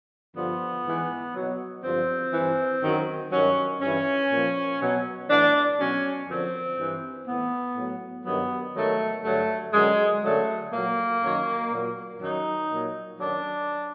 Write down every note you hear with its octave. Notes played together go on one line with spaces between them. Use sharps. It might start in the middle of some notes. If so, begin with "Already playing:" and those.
G2 D3 F3 B3
G#2 E3
B2 F#3
G2 D3 F3 C4
G2 E3
F#2 D#3 F#3
G2 D#3 F#3 C#4
G2 E3 C#4
A#2 F3
B2 F#3
A2 E3 D4
B2 F#3 C#4
F#2 D3 F3 C4
G2 E3
A2 E3 B3
A2 F#3
G2 D#3 F#3 B3
G#2 D#3 F#3 A3
G2 D3 F#3 A3
F#2 D3 F#3 G#3
F#2 D3 F#3 A3
A#2 F#3 A#3
F#2 D#3 F#3
A#2 F#3
F#2 D#3 F#3 D#4
A#2 F#3
F#2 D#3 F#3 D4